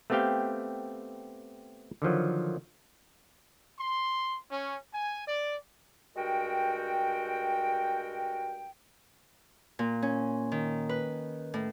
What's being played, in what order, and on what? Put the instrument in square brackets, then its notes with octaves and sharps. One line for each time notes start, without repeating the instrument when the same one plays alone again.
[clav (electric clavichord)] A3 B3 C4 G4 F5 G5
D3 D#3 F3 F#3
[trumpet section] C6
C#4
G#5
D5
[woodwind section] G2 G#3 F#4 A#4 G5
[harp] A#2
C#4
D#3
B4
A2